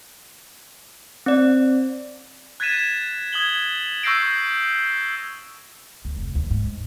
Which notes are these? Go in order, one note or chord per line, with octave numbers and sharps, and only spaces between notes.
C4 D5
F#6 G#6 A6 B6 D#7 E7
D#6 G#6 F#7 G7
C#6 E6 G6 A#6 C7 D7
D2
F1
D#2
G#2